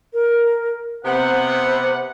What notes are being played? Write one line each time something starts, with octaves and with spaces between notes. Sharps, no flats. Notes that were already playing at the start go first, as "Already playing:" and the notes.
A#4
C3 B3 C5 F#5